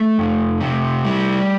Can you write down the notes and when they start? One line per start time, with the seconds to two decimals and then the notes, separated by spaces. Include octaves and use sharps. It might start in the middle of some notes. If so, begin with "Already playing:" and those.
Already playing: A3
0.18 F2
0.60 C3
1.05 G3